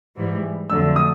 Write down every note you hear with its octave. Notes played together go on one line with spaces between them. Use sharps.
G#2 E3 G3
F2 D3 F#3 A3 E6
D#6